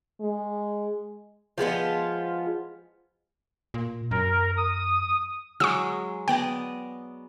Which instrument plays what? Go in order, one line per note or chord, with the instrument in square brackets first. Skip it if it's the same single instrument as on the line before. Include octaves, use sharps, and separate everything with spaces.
[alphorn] G#3
[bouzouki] F3 G#3 B3 F4
[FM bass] A#2
[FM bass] F#2 [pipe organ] A#4
[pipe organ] D#6
[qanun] F#3 G#3 [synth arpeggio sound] C#6 D#6 E6
[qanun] B3 D5 D#5 [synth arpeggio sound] G5